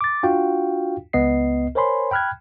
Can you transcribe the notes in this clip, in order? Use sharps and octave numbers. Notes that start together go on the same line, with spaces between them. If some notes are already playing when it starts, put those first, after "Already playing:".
D6 A6
D4 F4 F#4 F5 G5
C#2 B3 D#5 C7
A#4 C5 C#5 G#5 B5 C6
G5 B5 F6 F#6 G#6